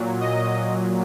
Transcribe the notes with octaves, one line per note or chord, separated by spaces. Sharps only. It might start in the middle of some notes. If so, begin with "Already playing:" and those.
Already playing: A#2 F#3
D#5